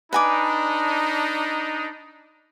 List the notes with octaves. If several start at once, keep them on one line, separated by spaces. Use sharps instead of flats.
D4 D#4 B4 G#5 D6